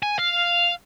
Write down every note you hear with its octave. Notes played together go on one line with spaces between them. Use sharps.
G#5
F5